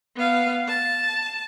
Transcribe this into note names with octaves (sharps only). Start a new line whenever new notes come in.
B3 F5
A5